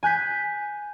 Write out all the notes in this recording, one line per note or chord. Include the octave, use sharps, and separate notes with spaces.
G#5 F#6 G6 B6